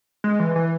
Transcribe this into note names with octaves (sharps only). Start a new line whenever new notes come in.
G#3
E3
E3